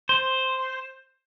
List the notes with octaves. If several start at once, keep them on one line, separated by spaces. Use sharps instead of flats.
C5